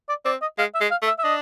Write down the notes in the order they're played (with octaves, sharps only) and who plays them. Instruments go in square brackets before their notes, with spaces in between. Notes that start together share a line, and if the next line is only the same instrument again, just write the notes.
[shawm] D5
[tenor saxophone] C4 [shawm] D5
[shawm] D#5
[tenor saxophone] G#3 [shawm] F5
[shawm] E5
[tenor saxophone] G#3
[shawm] F5
[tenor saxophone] A3
[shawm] E5
E5
[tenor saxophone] D4 [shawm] D#5